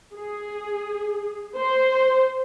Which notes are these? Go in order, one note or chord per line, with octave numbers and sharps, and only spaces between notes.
G#4
C5